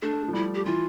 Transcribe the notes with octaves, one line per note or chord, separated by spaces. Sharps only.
A3 D4
A3
A3
F3
G3 E4
G4
E3 F4